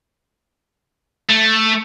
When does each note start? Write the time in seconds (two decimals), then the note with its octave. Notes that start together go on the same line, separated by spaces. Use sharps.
1.29 A3